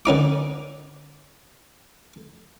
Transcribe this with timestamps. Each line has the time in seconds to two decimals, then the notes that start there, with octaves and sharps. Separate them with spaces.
0.05 D3 C#4 D#4 D6